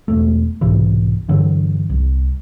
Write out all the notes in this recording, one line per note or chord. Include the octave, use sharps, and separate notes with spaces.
E1 A3
B1 G#2 C3 E3
G2 D3 E3 F#3
C2